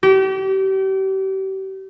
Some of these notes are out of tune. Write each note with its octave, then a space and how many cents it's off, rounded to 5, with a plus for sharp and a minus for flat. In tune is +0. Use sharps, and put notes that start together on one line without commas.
G4 -35